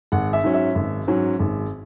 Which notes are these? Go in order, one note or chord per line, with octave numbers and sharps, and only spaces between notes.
G#1 F#5
E5
G#2 F#3 C#4
E5
G#1
G#2 F#3 C#4
G#1